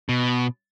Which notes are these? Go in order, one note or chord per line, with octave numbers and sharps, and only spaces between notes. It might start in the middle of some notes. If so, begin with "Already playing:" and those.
B2